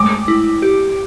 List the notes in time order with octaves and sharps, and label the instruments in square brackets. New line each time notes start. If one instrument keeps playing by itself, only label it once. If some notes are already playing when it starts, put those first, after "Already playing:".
Already playing: [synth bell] G#3 A3 [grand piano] D6
[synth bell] E4
G4